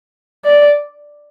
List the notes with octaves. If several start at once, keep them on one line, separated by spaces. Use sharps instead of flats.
D5